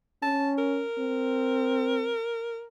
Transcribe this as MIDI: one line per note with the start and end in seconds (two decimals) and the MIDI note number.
0.22 0.84 61
0.22 0.52 81
0.58 2.65 70
0.98 2.13 60